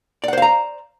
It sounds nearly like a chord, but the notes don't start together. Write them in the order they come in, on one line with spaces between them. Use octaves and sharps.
D5 F#5 C5 F5 A#5